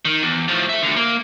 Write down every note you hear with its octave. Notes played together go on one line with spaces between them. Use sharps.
D#3
E2
A2 F3
A4 E5
D2 D3
A#3